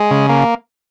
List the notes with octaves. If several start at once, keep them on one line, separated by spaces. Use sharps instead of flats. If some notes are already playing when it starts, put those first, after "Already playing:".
Already playing: G#3
C#3
A#3